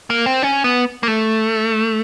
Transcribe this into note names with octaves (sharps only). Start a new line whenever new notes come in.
A#3
C4
C#4
B3
A#3
A3